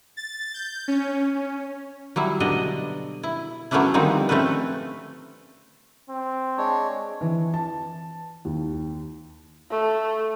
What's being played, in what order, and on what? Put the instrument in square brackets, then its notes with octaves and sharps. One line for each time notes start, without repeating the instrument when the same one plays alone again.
[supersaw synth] A6
G6
C#4
C#4
[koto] F#3 G3 E4
B2 D3 D4 D5 D#5
E4
F#3 A3 B3 C#4 D4 E4
D3 D#3 F3 G3 C4 D#4
A3 C4 C#4 A4 B4
[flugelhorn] C4
[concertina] G#3 D4 C#5
[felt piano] E3
A5
D#2
[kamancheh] A3